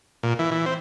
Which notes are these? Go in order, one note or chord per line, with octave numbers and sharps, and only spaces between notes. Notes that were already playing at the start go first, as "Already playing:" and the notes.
A#2
E3
E3
C4